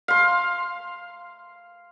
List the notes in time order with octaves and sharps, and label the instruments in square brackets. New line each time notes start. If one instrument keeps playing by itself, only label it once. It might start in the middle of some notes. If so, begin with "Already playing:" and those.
[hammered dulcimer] F5 C6